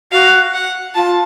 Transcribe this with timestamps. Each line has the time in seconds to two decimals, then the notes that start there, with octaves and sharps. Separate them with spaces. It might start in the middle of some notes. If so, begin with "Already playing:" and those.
0.12 F#4 F5
0.54 F#5
0.95 F4 A5